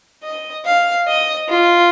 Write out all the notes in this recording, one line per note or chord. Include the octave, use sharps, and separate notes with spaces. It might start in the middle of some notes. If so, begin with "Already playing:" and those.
D#5
F5
D#5
F4